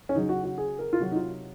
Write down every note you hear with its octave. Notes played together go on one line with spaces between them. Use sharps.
C#4
C#3 F#3 D#4
F#4
F#4
G#4
A#4
F4
C3 F#3 F#4
D#4
F4